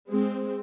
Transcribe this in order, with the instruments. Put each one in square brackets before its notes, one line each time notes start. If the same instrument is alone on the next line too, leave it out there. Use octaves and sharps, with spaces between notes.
[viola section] G#3 C4